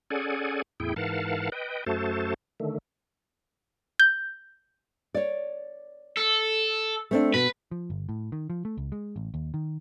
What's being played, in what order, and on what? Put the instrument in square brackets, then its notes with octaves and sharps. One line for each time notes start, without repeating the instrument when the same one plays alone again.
[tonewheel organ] C#4 G#4 A4 D5 F#5 G#5
E2 A2 E4 G#4 G5
G#2 E3 A#4 F5 F#5 A5
B4 D#5 G5
F#2 A3 F#4 A4 C5 A5
D3 D#3 A3
[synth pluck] G6
[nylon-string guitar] C#5 D5
[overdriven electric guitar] A4
[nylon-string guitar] A3 C4 D4
[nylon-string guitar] B2 [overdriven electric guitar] B4
[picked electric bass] F3
G1
A2
D#3
F3
A3
C#2
G#3
A1
D#2
D#3